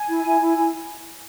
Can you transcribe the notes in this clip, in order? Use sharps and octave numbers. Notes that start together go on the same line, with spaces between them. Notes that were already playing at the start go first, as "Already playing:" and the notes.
Already playing: G#5
E4
E4
E4
E4